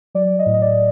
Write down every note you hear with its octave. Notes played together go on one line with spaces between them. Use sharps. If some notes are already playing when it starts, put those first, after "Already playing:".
F#3 D5
D#5
A2
D#5
D5